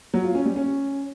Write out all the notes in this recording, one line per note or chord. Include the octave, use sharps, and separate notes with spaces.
F#3
F4
C#4
G3
C#4